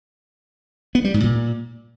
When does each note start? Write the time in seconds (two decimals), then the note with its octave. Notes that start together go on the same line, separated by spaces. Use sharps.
0.95 B3
1.04 G3
1.14 G#2
1.24 A#2